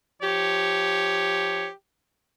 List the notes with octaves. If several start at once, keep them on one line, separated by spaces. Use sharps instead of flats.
F3 G4 C#5